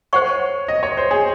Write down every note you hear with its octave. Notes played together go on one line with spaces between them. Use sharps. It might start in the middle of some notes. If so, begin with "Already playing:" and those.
C5 C#5 F#5 C#6
D#5
C#5
C5
G#4